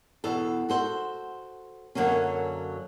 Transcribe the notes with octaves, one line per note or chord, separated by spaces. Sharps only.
E2 B2 A4
F#4 A4 C5
F#2 D3 F#3 A#3 C#4